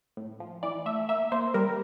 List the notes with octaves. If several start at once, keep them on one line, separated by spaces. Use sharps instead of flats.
A2
F3
E3 D5
A3 E5
A#3 E5
A#3 C5
G3 A#4